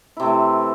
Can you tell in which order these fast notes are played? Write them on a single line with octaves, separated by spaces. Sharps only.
E4 C3 A3 E3